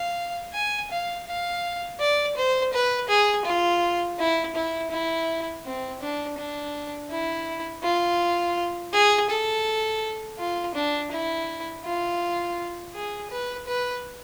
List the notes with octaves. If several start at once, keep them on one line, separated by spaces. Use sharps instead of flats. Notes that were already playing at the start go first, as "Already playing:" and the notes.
Already playing: F5
G#5
F5
F5
D5
C5
B4
G#4
F4
E4
E4
E4
C4
D4
D4
E4
F4
G#4
A4
F4
D4
E4
F4
G#4
B4
B4